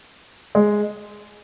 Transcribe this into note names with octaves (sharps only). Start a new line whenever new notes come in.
G#3